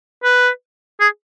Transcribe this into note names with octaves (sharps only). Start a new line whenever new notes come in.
B4
G#4